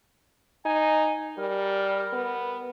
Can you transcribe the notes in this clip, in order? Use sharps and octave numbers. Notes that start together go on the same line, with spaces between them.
D#4 G#5
G3 A#4
B3